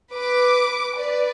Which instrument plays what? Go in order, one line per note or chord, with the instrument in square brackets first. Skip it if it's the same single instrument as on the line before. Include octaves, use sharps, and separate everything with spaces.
[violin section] B4 D6
B4 D5